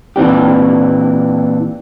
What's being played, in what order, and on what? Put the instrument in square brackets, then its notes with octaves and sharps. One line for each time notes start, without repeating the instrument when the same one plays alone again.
[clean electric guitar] A#2 E3 C4 D4 G4